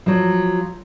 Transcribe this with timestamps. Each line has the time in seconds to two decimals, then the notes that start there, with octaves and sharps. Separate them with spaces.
0.06 F3 F#3